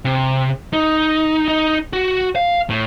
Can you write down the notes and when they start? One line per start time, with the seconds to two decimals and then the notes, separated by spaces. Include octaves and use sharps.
0.05 C3
0.73 D#4
1.48 D#4
1.93 F#4
2.36 F5
2.70 A2